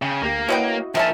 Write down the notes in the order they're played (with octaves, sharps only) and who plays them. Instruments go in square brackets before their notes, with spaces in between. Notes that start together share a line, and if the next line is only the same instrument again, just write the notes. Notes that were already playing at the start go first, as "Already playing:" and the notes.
[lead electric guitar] C#3 [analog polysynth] G5
[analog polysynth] D2 G4 [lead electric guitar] A#3
[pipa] C#4 B4 G5 [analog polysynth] E4 F#4 D#5
[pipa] D#3 G#5 A5 [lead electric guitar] F3 A#4 [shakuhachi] E5